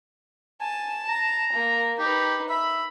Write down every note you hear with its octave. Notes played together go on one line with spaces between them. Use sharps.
G#5 A5
A#5
A#3
D#4 G4 B4
E5 B5